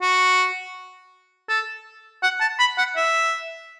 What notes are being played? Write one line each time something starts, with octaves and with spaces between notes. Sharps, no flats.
F#4
A4
F#5
A5
B5
F#5
E5